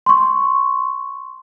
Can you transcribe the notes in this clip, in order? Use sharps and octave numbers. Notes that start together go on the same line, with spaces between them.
C6 C#6